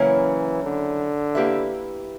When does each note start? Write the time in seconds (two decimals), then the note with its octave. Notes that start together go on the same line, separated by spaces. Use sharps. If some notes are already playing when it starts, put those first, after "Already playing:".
Already playing: C#3 E3 F#3 A#3 C#4 E4
0.64 D3
1.35 A#3 E4 G4 B4 E5